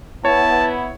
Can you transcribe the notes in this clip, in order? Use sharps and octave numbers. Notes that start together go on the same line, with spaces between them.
B3 E4 C#5 A5